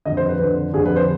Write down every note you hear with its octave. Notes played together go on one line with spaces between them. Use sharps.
F2 D3 D#5
C5
B4
F2 D3
F2 D3 G#4
B4
C5